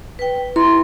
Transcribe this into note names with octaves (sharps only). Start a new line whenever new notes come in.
B4 G5
E4 C6